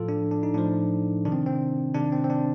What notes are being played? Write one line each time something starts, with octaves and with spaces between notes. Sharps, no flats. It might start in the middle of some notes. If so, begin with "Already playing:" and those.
Already playing: A2 F3 F4 A4
D4
D4
D#4
A2 F3 D4
C3 D#3 D4
C4
C4
C3 D#3 D4
C4
C4
D4